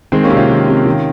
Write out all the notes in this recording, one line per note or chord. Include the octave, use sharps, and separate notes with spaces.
D#3 G#3 C4
A#3 C#4
C3
C#4 F4
D#3
C3
D#3